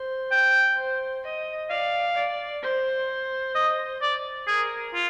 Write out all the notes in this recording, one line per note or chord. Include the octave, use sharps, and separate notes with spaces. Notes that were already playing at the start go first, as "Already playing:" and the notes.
Already playing: C5
G5
C5
D#5
D5 F5
D5
C5
D#5
D5
G#4 A#4
F4